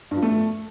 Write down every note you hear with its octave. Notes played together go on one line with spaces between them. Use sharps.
G2
F3
A3